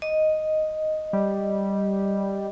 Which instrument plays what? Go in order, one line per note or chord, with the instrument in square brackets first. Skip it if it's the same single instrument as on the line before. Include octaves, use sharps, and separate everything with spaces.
[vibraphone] D#5
[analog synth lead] G3